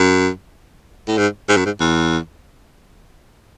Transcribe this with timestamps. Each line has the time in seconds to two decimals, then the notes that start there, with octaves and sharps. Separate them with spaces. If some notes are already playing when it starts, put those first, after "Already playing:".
Already playing: F#2
1.08 A2
1.17 G#2
1.49 G#2
1.57 F#2
1.66 G#2
1.80 E2